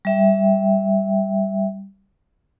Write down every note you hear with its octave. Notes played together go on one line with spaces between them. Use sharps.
G3 E5 G5